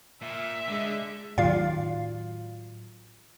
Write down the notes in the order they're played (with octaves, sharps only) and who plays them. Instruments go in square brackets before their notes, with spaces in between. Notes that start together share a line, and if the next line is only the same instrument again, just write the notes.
[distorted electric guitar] A#2 [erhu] E5
[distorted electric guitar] D3 [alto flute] G#3
[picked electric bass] A2 D#3 F#3 [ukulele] F4 D5 [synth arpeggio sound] F5